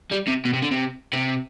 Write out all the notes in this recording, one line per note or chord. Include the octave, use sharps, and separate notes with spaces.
G3
C3
B2
C3
D3
C3
C3